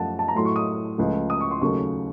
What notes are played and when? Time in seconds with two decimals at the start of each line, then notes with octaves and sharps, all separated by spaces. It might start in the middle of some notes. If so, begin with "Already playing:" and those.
Already playing: F#2 F3 A3 F#5 A5
0.19 A5
0.28 A#5
0.35 A2 F#3 A3 C6
0.45 C#6
0.56 D#6
0.98 C#2 C#3 F3 A3
1.30 D#6
1.41 C#6
1.51 C6
1.61 D#2 C#3 F#3 A3 C#6